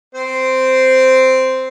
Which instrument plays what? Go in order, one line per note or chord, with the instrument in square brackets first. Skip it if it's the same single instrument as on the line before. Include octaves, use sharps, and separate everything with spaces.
[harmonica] C4 C5